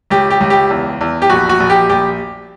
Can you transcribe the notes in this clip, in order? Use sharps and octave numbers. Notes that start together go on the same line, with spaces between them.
C#2 G4
G4
C#2
G4
E2
E2
G4
A#1 F#4
F#4
A#1
G4
A#1 G4